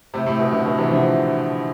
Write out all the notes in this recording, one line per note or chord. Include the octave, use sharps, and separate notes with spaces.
A2 C3
A2 C3
B2
B2 D3
B2 D3
C3 E3
D3 F3